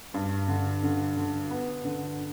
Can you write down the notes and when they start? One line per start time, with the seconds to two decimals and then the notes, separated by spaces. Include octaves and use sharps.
0.14 G2
0.48 D3
0.83 D3
1.17 D3
1.50 B3
1.85 D3